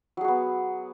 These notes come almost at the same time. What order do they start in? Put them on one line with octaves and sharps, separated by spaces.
F#3 G#4 F#4 B3